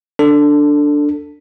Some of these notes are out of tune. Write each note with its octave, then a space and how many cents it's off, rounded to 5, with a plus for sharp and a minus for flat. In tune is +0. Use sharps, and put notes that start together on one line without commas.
D4 +0 A4 +20